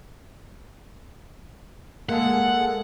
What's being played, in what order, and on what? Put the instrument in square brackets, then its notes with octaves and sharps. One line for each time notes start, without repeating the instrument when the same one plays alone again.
[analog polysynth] G#3 A4 [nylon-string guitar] A#3 [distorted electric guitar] F#5